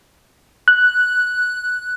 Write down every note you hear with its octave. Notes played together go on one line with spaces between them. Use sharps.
F#6